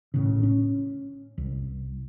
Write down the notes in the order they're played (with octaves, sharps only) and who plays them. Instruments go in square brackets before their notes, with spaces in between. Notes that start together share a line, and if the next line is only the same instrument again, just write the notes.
[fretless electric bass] A1 A2 C#3
C#4
C2